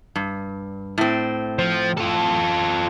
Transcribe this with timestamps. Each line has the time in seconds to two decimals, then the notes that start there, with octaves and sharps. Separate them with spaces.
0.15 G2
0.98 A2 C4
1.59 F3
1.97 F4 A4